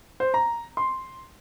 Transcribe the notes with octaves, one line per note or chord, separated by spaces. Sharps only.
C5
A#5
C6